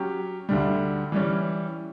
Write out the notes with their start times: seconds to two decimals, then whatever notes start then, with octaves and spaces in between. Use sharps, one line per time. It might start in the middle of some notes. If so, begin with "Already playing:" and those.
Already playing: F#3 C#4 G4
0.49 D2 D3 G3
1.12 E3 G3 C#4